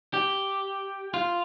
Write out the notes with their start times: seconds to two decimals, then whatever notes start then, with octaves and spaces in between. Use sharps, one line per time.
0.14 G4
1.14 F4